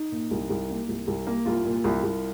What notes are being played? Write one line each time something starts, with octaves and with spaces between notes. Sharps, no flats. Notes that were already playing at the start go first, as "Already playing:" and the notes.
Already playing: D#4
A#2
C2
C2
A#3
C2
C2
A#3
C2 F4
A#2
C2
C2